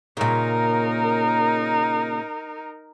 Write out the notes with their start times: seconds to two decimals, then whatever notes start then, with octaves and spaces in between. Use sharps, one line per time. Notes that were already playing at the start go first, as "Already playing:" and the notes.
0.17 A#2 C#3 D#4 A#4